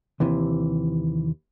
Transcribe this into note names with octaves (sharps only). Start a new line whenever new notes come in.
D#2 C3 E3